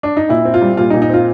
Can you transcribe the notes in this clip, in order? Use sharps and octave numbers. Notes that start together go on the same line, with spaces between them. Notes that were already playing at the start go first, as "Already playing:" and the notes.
D4
D#4
A#2 E4
C4
F4
G3
A#2 F4
D#4
A#2
D#4
C4 F4